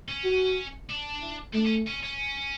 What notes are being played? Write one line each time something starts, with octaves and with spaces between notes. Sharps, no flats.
C#4
F#4
D4
E4
A3 D4
C#4
C#4
C#4